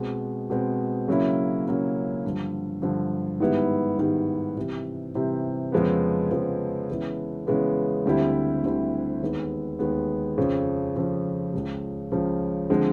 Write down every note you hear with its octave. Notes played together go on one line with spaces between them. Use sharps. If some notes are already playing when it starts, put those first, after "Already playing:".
Already playing: B2 G#3 C4
B2 G#3 C4
C#3 F#3 A#3 C#4 E4
C#3 F#3 A#3 C#4 E4
G2 D3 F3
G2 D3 F3
G#2 D#3 G3 B3 E4
G#2 D#3 G3 B3 E4
C3 E3 G3 C4
C3 E3 G3 C4
F2 C#3 F3 G#3 B3
F2 C#3 F3 G#3 B3
C#3 E3 G#3 B3
C#3 E3 G#3 B3
D2 D3 G3 C4 E4
D2 D3 G3 C4 E4
D#2 D#3 G#3 B3
D#2 D#3 G#3 B3
F2 C#3 F3
F2 C#3 F3
C#2 C#3 F3
C#2 C#3 F3
D3 F3 G#3 C4